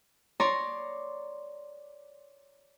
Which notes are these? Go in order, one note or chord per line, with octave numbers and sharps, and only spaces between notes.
C#5 D5 A#5 C6